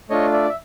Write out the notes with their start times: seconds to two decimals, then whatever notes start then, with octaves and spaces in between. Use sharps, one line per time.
0.10 A3 D4 F4 C#5 D#5
0.33 D5 E5
0.49 E5